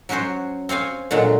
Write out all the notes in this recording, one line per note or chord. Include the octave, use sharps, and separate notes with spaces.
F#3 C#4 F#4 C5 C#5
C4 C#5 F5 G#5
A#2 D3 F#3 G#3